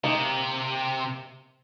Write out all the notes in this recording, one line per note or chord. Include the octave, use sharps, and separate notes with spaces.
C3 A#3 D#4